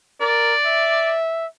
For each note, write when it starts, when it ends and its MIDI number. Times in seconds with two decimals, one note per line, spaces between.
0.21 0.54 70
0.21 1.14 74
0.66 1.46 76